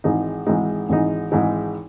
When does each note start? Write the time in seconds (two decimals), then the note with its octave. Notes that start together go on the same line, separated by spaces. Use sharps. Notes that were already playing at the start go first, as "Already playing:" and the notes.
0.04 G#1 G#2 E3 G#3 D#4
0.47 G#1 G#2 E3 G#3 D#4
0.89 G#1 G#2 E3 G#3 D#4
1.32 G#1 G#2 E3 G#3 D#4